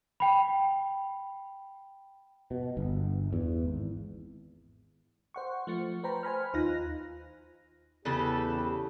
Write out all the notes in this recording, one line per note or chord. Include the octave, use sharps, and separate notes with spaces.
G5 B5
B2
G1
E2
G#1
C5 F#5 C#6
F3 A3 C#7
B4 C5 G5 A#5 B5
C5 G#5 B5 F6
D#2 D#4 F4 F#6 A#6
E2 C#3 G4 A4 B4